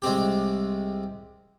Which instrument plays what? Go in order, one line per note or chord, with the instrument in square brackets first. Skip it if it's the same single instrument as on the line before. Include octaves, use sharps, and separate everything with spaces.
[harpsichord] C2 G#3 C4 G4